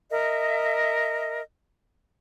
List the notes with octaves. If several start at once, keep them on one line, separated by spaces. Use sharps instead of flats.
A#4 D#5 E5